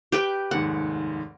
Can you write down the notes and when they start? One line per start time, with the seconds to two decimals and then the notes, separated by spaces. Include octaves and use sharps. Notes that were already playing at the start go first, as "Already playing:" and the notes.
0.12 G4 B4 G5 D7
0.51 F1 D#2 G#2 F#5